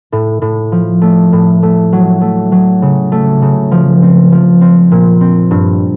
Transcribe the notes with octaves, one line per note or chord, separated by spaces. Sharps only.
A2
A2
F3
A3
A2
A3
F#3
A3
F#3
C#3
A3
C#3
F3
C4
F3
C4
A#2
C4
G2